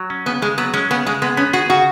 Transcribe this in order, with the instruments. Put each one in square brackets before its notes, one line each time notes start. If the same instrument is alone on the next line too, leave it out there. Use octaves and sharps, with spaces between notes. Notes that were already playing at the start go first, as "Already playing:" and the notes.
Already playing: [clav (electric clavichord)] F#3
C#4
[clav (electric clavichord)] C#3 [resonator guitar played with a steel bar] B3
[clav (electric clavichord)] C#3 [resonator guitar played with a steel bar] G#3
[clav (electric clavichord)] F#3 [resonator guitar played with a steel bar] B3
[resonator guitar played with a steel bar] G#3 [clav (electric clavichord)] C#4
[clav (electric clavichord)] C#3 [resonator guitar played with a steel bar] B3
[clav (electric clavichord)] C#3 [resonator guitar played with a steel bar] G#3
[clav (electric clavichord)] G#3 [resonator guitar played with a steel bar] B3
[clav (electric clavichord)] B3 [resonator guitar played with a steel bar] C#4
[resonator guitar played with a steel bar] F#4 [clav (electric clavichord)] G#4
[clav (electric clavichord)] C#3 [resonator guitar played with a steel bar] F#4